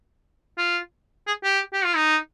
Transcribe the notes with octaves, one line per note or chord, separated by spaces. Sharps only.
F4
G#4
G4
G4
F4
D#4